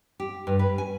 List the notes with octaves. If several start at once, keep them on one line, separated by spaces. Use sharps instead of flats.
G4
G2
B4
G#5